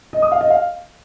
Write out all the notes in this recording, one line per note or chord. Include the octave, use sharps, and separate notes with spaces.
D#5
D#6
F5
D#5
F5